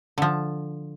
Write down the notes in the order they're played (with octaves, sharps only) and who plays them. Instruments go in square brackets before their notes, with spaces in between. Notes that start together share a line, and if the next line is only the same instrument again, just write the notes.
[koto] D3 F3